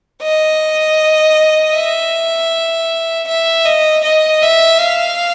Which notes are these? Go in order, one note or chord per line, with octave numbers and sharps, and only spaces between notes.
D#5
E5
E5
D#5
D#5
E5
F5